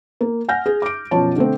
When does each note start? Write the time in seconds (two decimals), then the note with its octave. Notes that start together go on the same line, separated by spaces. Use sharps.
0.21 A#3
0.49 F#5 G#5 F6 G6 A#6
0.66 G#4
0.82 D6 D7
1.11 F#2 B2 F3 C#5 A5
1.36 D3 A3 C4